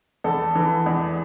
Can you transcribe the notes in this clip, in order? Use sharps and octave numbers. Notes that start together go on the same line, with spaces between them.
E2 A4
E3
E2